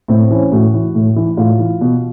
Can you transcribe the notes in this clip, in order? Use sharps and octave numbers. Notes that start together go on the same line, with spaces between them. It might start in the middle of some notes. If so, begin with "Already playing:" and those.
A2 C4
E3 C#4
A2 F#4
E3
A2
E3
A2 F4
E3
B2